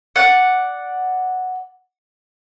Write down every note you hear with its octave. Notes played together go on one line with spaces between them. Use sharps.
D5 F#5